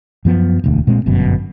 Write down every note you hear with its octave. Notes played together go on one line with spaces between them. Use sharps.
F#2 F3 B3
E1 D2
A#2 G#3 C4
G1 F#2 B2